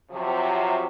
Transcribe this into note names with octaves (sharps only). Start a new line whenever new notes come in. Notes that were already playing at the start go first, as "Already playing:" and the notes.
C3 F3 F#3